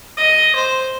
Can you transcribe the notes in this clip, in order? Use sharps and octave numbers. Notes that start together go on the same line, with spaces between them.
D#5
C5